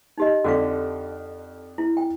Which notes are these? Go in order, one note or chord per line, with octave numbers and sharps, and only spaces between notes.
D#4 G4 D#5
F2 D3 F#4 F5
E4
G5